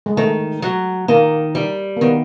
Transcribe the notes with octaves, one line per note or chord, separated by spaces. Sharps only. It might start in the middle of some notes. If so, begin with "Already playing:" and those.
G#3
D#3 A3
F#3
D#3 A#3
G3
A#3
D#3 B3